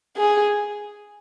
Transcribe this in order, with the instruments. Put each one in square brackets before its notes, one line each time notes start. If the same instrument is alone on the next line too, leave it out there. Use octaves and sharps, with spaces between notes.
[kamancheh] G#4